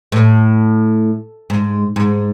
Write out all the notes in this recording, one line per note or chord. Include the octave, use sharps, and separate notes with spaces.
A2
G#2
G#2